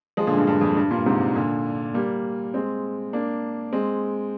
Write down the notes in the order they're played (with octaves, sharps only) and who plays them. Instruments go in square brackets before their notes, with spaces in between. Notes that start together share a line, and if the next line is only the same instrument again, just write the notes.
[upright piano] F3 G#3
A#2 D3
G2
G2
F2
G2
G2 A#2
G#2 C3
A#2 D3
G3 A#3
G#3 C4
A#3 D4
G#3 C4